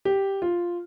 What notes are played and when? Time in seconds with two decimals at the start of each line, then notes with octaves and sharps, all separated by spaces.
0.05 G4
0.42 F4